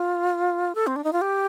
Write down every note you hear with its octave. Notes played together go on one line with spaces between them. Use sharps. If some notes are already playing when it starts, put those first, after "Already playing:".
Already playing: F4
A4
C4
D4
D#4
F4
G4